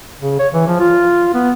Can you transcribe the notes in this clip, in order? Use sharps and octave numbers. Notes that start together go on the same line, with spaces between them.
C#3
C#5
E3
F3
F4
B3